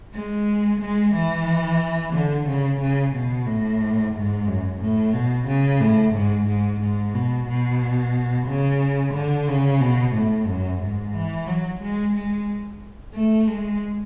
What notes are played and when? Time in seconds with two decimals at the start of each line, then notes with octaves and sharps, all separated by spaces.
0.14 G#3
0.80 G#3
1.14 E3
2.13 D3
2.47 C#3
2.80 C#3
3.14 B2
3.47 A2
4.14 G#2
4.47 F#2
4.81 A2
5.13 B2
5.47 C#3
5.81 A2
6.14 G#2
6.47 G#2
6.80 G#2
7.14 B2
7.48 B2
8.47 C#3
9.14 D3
9.47 C#3
9.81 B2
10.13 A2
10.47 F#2
10.81 G#2
11.14 E3
11.47 F#3
11.81 G#3
12.14 G#3
13.14 A3
13.47 G#3